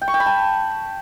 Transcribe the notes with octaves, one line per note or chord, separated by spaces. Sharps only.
G5
C#6
G5
B5
A5